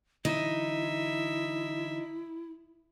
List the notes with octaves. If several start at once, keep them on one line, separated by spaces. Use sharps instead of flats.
D3 E3 F#3 D#4 E4 E5